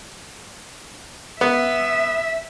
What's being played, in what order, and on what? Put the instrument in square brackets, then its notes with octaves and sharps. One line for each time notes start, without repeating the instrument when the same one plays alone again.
[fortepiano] B3 [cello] E5